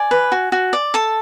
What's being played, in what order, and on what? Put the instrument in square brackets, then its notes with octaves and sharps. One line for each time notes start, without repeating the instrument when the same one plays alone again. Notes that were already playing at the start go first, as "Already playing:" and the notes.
Already playing: [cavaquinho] D5 G#5
B4
F#4
F#4
D5
A4 A5